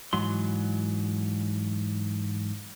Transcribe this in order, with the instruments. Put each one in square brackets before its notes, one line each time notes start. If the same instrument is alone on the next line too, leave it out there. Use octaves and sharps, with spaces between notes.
[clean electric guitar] G#2 E3 F#3 C6